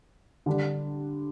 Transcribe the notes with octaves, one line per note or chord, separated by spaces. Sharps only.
D3 G3 D4